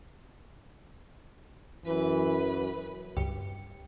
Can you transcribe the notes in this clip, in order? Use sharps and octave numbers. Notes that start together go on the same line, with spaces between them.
F#2 E3 B4
C#2 G2 G4 C#7